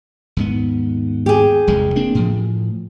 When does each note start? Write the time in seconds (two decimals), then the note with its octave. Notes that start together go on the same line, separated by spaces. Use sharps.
0.37 D#2 G#2 B3
1.26 G4 G#4
1.67 F1 E2 G#3
1.96 A#3 C4 D4
2.15 A2 F3